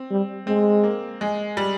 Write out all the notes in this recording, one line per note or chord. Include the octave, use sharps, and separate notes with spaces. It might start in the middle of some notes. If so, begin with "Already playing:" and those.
Already playing: C4
G3
G#3 C4
A#3
G#3
G3